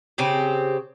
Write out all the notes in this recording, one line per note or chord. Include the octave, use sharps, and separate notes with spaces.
C#3 C4 G4